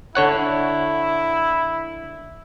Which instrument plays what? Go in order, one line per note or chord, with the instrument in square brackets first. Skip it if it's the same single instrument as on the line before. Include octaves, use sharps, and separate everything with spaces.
[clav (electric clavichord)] D3 C#5 F#5 [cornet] E4